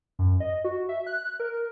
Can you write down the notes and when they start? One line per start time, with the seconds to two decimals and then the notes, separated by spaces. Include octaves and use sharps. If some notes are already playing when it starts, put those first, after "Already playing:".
0.19 F#2
0.40 D#5
0.64 F#4
0.89 E5
1.07 F#6
1.21 F#6
1.40 A#4